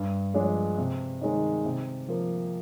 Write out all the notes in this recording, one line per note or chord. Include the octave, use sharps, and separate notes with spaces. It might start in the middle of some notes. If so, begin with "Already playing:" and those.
Already playing: G2
F3 G#3 D4
C3
D#3 G#3 D#4
C3
F3 A#3